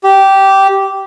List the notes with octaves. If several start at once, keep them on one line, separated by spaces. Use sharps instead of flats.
G4